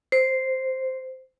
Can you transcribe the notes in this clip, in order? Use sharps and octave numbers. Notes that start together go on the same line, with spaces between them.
C5